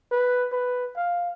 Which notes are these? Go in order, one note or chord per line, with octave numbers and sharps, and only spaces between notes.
B4
B4
F5